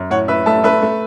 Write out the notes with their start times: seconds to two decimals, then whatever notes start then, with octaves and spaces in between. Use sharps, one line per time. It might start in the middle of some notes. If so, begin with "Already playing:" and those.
Already playing: F#2
0.10 A2 C#5 F#5
0.28 A2 B4 E5
0.46 A3 E5 A5
0.64 A3 B4 E5
0.82 A3